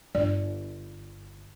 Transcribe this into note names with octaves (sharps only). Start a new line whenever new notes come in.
G1 D5